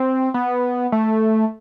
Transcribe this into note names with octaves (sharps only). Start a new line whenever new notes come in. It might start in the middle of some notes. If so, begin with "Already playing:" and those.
Already playing: C4
B3
A3